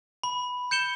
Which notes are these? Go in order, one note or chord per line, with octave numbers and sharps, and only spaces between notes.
B5
G6 C#7 E7 G7